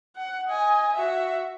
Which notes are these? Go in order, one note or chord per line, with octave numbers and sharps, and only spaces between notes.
F#5
D#5 G#5
F#4 E5